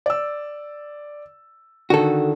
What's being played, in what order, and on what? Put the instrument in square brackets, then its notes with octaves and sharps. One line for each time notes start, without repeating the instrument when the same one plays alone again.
[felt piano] D5 E6
[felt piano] D3 D#3 [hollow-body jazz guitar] F#4 A4